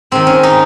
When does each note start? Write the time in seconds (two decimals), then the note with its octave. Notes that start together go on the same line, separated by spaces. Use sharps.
0.11 G#2 D#3 C4
0.27 C#4
0.43 D#4